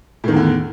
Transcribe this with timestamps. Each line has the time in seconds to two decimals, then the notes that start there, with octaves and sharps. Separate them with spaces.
0.24 A2
0.28 D#3
0.32 E2
0.36 D3